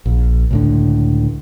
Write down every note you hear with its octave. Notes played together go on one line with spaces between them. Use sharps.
A#1
C#2 A2 D3